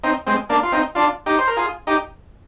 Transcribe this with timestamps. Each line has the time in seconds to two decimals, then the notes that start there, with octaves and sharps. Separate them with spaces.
0.03 C4 D#4
0.27 G#3 C4
0.49 A#3 D4
0.63 F4
0.72 C4 D#4
0.95 D4 F4
1.26 D#4 G4
1.38 C5
1.47 A#4
1.57 F4 G#4
1.87 D#4 G4